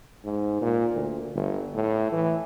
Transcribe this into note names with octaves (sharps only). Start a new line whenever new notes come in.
G#2
A#2
D2
G1
A2
E3